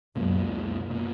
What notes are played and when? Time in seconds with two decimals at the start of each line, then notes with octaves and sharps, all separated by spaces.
0.16 C#2 F#2 B2 A#3
0.90 B2 A#3